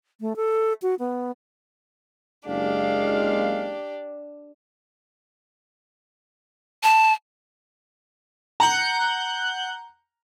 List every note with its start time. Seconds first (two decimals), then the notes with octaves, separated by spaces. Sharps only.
0.21 A3
0.36 A4
0.82 F#4
0.99 B3
2.47 F#1 G#3 D4 G4 F5
6.83 A5
8.60 F#5 A#5 F#6 G6